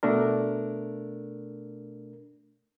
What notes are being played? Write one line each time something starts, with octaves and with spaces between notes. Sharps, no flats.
B2 A3 D4 A#4